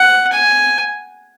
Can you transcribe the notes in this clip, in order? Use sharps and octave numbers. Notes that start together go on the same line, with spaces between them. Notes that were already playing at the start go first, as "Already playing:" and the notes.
Already playing: F#5
G#5